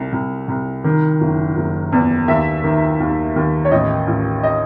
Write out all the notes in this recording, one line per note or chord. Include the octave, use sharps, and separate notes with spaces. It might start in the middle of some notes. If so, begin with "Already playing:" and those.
Already playing: C2
C2
C2
D#3
F#1
F#1
E2
D#2 E5
D#3
D#2
D#2
C#5
A1 D#5
A1
D#5